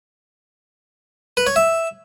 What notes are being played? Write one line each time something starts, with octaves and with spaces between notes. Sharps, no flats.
B4
C#5
E5